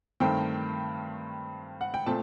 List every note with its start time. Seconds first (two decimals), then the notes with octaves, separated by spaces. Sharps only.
0.20 G2 D#3 A3 C4 G5
1.81 F#5
1.94 G5
2.06 A#2 A3 C4 A5